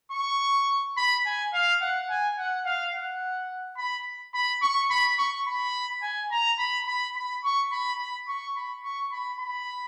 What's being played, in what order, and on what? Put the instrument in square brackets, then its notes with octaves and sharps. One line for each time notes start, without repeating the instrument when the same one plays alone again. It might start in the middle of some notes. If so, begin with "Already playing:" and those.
[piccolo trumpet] C#6
B5
G#5
F5
F#5
G#5
F#5
F5
F#5
B5
B5
C#6
B5
C#6
B5
G#5
A#5
B5
B5
B5
C#6
B5
B5
C#6
B5
C#6
B5
B5